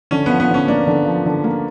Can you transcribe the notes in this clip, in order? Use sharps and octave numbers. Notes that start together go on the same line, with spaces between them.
D3 C#4
F3 B3
B3
D3 C#4
A#3 D4
D3
F3
D3
A#3